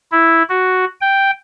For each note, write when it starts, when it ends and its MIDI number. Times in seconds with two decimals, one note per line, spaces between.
0.12 0.43 64
0.49 0.85 66
1.01 1.31 79